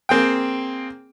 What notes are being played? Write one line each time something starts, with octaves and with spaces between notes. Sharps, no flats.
A#3 C4 G#4 G5